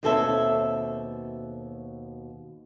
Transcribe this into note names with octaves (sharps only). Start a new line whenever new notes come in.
D#2 B2 C4 A4 C#5 E5